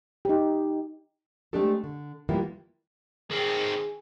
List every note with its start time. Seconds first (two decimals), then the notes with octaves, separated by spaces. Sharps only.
0.25 D#4 G4
1.53 G#3 A3 C4 D4 G4 A4
1.84 D3
2.29 E3 G3 A#3 B3 E4 F4
3.31 D#3 C4 G#4